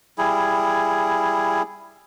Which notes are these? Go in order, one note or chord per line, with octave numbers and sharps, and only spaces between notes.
G3 E4 G#4